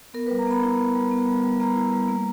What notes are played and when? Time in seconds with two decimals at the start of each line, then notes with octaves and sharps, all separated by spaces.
0.14 B3 A#4
0.27 G3 B4
0.39 A#5
0.47 B3 B5
0.63 E4
0.78 B3
0.95 G3
1.11 B3
1.28 G3
1.44 G3
1.60 B3 A#5
1.76 E4
1.93 G3
2.08 A#3